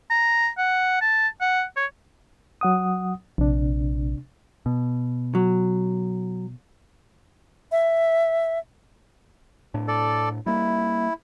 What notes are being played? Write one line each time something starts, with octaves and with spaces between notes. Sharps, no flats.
A#5
F#5
A5
F#5
C#5
F#3 F#5 D#6
A#1 C3 D4
B2
F#3
E5
A2 D4
A4 D5
G3 A#3 E4